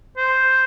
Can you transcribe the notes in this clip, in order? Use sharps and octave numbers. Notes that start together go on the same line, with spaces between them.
C5